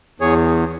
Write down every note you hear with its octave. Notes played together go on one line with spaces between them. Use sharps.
E2 G#4 C#5